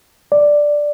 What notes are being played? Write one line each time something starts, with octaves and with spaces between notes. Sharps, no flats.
D5